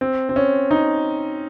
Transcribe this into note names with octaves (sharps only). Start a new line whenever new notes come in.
C4
C4
C#4
D#4